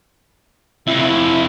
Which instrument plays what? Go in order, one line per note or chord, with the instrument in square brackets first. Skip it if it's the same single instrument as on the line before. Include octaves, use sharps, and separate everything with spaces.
[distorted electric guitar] F2 C3 [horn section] E4